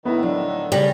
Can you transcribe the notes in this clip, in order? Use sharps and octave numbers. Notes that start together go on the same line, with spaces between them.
A2 D3 D#3 B3 E4
F#3 D4
C#3 G3 G#5 A#6